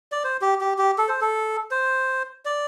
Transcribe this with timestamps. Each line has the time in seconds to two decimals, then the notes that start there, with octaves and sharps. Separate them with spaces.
0.12 D5
0.24 C5
0.42 G4
0.61 G4
0.78 G4
0.98 A4
1.08 C5
1.21 A4
1.71 C5
2.45 D5